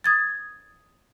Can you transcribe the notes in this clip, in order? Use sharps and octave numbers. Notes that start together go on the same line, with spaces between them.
D#6 G#6 A6